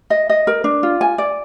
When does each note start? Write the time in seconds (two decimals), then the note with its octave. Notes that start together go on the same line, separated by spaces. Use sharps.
0.10 D#5
0.29 D#5
0.47 A#4
0.64 D4
0.83 F4
1.01 G#5
1.18 D5